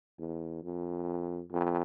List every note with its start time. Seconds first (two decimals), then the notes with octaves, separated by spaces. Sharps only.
0.19 E2
0.63 F2
1.52 F2